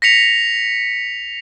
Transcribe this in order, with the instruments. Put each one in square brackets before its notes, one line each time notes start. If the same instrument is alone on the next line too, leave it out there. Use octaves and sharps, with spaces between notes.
[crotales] A#6 B6 C#7 F7